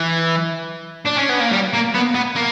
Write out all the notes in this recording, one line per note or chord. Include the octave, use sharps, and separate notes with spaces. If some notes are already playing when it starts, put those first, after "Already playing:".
Already playing: E3
D4
C#4
B3
A#3
G3
A#3
B3
B3
A#3